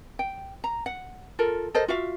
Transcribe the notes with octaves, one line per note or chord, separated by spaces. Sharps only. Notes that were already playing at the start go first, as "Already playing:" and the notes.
G5
A#5
F#5
F4 A4 A#4
A4 A#4 C5 D#5
F4 F#4 E5 F5